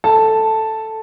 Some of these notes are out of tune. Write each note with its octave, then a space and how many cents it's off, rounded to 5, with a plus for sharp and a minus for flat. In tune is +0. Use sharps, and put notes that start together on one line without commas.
A4 +0 A5 +0